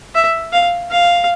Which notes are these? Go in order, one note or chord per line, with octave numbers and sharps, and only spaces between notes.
E5
F5
F5